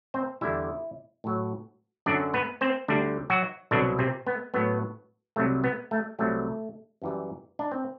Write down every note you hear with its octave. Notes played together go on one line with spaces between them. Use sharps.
C4 C5
E2 D3 G3 E4 E5
A2 F#3
F#2 D3 F#3 D4 D5
B3 B4
C4 C5
D2 D3 G3 D4
F#3 F#4
C2 B2 D3 F#3 D4
C3 C4
B3
A2 F#3 B3
C2 C3 F#3 A3
B3
A3
C2 C3 F#3 A3
F#2 E3 G3
D4
C4